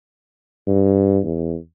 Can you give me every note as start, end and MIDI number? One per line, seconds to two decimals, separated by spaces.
0.67 1.19 43
1.24 1.56 40